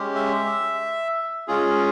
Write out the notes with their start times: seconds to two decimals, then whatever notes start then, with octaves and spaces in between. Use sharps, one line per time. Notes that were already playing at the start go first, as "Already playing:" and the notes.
Already playing: G#3 C#4 G4
0.15 E5
1.48 G#3 C#4 F4 G#4